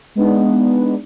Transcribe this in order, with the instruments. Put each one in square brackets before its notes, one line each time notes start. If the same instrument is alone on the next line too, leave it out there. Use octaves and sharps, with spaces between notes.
[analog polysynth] G#3 B3 D4 D#4